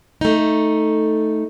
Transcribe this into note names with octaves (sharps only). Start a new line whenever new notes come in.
A3 D#4